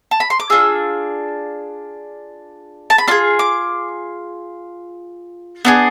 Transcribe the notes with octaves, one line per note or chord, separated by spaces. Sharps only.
A5
B5
C6
D6
D4 F4 G#4 E6
A5
B5
D4 F4 G#4 C6
D6
B3 D4 F4 G#4